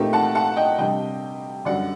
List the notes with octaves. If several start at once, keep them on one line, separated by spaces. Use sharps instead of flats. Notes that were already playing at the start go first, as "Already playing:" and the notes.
Already playing: A#2 A3 C4 D#4 G4 A#4
F#5 A5
F#5 A5
D#5 G5
C3 G3 D4 D#5 G5
F#2 D3 G3 D5 F#5